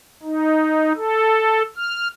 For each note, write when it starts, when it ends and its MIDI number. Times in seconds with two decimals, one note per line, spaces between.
0.23 0.92 63
0.96 1.62 69
1.76 2.08 89